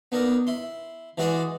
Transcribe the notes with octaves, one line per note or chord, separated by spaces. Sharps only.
B3 D4 D#4 A#4
E4 C6
E3 G#3 F#4 G#4 D5 D#5